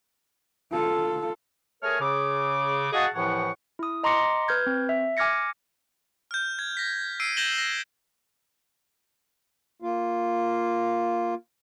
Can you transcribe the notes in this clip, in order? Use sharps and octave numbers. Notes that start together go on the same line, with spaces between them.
F4 A4
A3 G#4 A#4 C#5 G#5 F6
C#3 G#4 D6
F#4 G#4 D#5 F5 F#5 A5
C2 A2 E3 F3 F#5 C#6
E4 D#6
D#5 A#5 C6 D6 A#6 C#7
B4 F6 G6 G#6
C4
E5
G#5 D6 F6 G#6 A#6 C#7
F6 G6
G#6
A#6 B6
E6 C7 D7 D#7
G6 G#6 A#6 E7 F#7 G7
A#6
A#3 F4